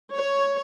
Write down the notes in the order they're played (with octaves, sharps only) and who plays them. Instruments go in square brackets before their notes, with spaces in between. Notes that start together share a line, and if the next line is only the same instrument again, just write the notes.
[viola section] C#5